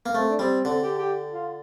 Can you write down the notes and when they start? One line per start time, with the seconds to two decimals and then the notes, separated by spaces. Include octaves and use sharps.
0.06 A#3
0.14 A3 C4
0.29 D4
0.39 G3 C4
0.64 D3 C4
0.81 G4
0.98 G4
1.32 F4